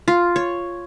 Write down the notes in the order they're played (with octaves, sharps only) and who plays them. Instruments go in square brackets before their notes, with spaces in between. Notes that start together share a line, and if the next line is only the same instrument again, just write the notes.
[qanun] F4
C#5